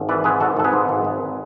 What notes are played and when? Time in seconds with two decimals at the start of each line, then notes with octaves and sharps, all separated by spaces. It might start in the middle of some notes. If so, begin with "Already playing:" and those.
Already playing: G#1
0.09 E3 B4 D5
0.24 G#2 G#4 B4
0.40 G#1 F#4 A4
0.57 G#1 A4
0.64 G#4 B4
0.73 G#2
0.89 G#1
1.05 G#1